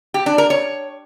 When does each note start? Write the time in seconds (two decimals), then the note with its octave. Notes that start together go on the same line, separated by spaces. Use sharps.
0.14 G4
0.26 D4
0.38 A#4
0.50 C#5